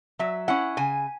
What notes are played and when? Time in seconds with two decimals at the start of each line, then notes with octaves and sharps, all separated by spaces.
0.19 F#3 E5
0.48 C#4 E4 F#5
0.77 C#3 G#5